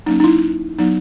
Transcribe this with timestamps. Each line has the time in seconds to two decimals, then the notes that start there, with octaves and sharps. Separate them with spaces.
0.06 F#3 A#3 C#4 D#4
0.20 D#4
0.24 E4
0.78 F#3 B3 D#4